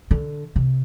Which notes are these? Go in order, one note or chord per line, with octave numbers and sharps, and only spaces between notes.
D3
C3